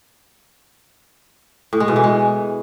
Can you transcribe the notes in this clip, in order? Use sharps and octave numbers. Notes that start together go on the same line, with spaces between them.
A2
G#3
B2
E3
G#3